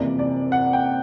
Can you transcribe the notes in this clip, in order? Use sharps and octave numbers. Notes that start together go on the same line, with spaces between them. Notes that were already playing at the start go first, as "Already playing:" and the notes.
Already playing: F#1 F2 C3 E3 D5
D5
F#5
G5